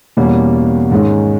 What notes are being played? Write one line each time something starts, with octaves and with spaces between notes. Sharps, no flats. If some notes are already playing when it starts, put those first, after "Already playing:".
E2 B2 G3 A#3 C#4
G#2 D#3 G#3 C#4